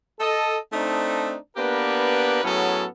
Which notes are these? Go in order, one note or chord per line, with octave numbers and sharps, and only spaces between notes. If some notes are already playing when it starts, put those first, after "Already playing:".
A4 D#5
A3 C4 D4 D#4
A#3 B3 D4 G4 A#4 B4
A2 F#3 B3 C#4 G#4 A4